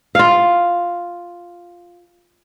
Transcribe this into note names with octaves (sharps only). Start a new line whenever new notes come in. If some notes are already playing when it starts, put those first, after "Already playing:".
F4 F5